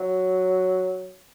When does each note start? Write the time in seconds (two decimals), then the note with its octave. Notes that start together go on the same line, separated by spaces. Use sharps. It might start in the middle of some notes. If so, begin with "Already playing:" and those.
Already playing: F#3